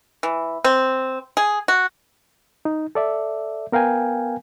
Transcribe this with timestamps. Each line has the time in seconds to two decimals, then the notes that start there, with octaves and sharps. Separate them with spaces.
0.23 E3
0.64 C4
1.37 G#4
1.68 F#4
2.65 D#4
2.95 A4 D5 E5
3.72 B3 A#4 F5 G5 G#5